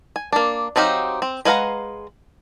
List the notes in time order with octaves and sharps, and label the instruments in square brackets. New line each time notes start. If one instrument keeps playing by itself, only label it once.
[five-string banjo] G#5
A#3 D4
F#3 C4 D#4 G4 F5
C4
G#3 B4 F5 F#5 A#5